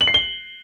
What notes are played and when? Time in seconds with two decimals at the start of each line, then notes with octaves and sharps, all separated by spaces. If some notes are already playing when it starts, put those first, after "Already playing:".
0.01 F#7
0.07 C7
0.14 G7